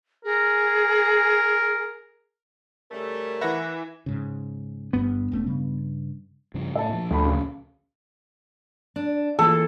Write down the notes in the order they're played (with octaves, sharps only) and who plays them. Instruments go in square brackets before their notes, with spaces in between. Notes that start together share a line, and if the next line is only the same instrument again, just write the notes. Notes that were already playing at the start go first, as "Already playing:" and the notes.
[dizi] G#4 [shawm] A#4
[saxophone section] C#3 G3 A3 [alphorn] A#4
[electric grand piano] E3 E5 [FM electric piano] B4 F#5 A#6
[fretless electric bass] G#2 C#3
[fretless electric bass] G1 G2 [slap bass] B3
[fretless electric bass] E1 A3 C#4
G2 C#3 G3
[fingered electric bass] G2 C#3 F3
[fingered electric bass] A2 A3 [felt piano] E5 A5
[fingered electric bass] A#2 F3
[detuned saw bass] D2 [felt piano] A3 B5
[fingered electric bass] A#1 [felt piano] C#3
[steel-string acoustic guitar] D4
[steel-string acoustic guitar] E3 A#3 F4 [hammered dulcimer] A4